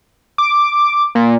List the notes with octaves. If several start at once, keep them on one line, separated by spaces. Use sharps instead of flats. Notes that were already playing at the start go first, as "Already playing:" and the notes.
D6
A#2